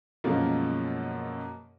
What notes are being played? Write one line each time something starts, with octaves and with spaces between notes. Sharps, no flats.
F#2 B2 F3 G#3 A#3